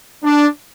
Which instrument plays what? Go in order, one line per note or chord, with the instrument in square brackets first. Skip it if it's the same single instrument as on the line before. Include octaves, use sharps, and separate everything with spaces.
[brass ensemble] D4